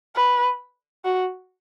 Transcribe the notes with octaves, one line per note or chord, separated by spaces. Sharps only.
B4
F#4